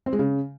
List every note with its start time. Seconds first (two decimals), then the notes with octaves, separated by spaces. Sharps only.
0.06 C4
0.13 G#3
0.19 C#3